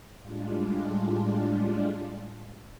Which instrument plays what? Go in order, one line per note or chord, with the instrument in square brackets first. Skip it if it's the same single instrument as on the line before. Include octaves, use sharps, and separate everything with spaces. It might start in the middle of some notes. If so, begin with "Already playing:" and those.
[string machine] A2 G3 G#3 D4 F4